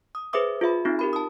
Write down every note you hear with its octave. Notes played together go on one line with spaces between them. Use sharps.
D#6
G#4 B4 C5 E5 D6 D#6
F4 G#4 E5 B5
C4 D#4 F4
G4 A#4 B5
A5 D#6